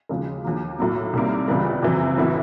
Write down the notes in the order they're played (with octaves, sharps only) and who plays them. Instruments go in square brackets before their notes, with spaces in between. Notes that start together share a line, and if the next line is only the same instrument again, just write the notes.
[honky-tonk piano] D#2 C#3 F3 G#3
D#2 D3 F3 A#3
B1 A2 F#3 A#3
C2 C3 D#3 G3 A#3
C#2 C#3 E3 G3
F#1 F2 C3 E3
A1 A2 F#3 B3 E4